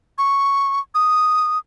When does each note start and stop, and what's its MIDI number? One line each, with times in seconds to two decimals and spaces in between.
0.18 0.80 85
0.95 1.58 87